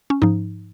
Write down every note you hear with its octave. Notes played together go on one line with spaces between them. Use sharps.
C#4
G#2 F3 D#4